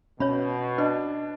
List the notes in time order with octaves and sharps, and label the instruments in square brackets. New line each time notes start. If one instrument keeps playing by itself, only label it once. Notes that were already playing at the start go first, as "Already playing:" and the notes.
[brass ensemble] B2 [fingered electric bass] C#4 [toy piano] C#5 E5 B5
[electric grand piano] D4 [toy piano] B4 D#5